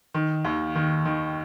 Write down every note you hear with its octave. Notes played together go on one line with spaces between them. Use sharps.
D#3
D#2
D#3
D#3